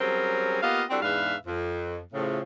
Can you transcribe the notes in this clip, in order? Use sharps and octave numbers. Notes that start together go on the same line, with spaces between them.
F#3 G3 C4 C#4 G#4 A#4
A#3 B3 F4 G4 D#5 F5
G3 C4 D4 E4 F#4 A4
E2 G#2 D4 B4 E5 F5
F2
A2 C#3 F3